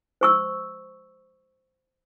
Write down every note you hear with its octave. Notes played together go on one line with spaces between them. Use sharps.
C5 C#6 E6